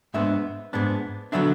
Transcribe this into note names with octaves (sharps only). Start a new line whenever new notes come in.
G#2 G#3 B3 D4 E5
G#2 G#3 B3 D4
D3 F#3 B3 D4 E5